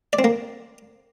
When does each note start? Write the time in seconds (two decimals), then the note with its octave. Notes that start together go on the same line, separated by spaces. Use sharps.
0.13 D5
0.19 C4
0.24 A#3